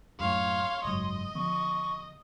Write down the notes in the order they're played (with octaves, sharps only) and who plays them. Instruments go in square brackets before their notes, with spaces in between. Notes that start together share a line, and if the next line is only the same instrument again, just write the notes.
[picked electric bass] F#2 A2 [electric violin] C#5 F5 [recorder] C6
[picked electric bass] F#1 G#2 F#3 [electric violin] D#5
[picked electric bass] D3 F3 B3 [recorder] C#6